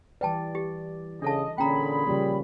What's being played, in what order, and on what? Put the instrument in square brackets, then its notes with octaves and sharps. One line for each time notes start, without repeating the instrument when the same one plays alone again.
[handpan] E3 G3 D5 [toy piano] B4 G5 A5
[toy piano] G4
[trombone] C#3 [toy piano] D4 A4 A5 [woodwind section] D#5
[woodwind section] A#2 G#4 B5 [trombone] D3 [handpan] A#3 C#4 [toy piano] G5 A#5
[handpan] C#3 F3 A#3 [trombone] G3